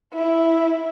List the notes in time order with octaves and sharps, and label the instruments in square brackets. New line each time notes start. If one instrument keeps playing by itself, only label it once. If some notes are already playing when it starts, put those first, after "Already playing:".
[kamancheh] E4